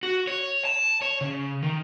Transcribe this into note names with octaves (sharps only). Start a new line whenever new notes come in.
F#4
C#5
A5
C#5
C#3
D#3